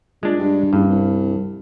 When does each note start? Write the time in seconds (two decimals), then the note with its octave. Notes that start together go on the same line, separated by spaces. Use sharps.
0.23 A#2 G#3 D4
0.38 G2
0.73 F#1 G2
0.89 C2